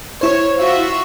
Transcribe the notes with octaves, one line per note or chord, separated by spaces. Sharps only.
E4 C5 C#5
F4 F#4 E5